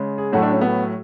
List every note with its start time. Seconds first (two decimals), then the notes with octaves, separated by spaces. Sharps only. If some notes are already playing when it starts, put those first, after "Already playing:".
Already playing: C#3 G#3
0.18 G#4
0.32 A2 F#3 A3 F#4
0.42 D4
0.52 C#4
0.61 B3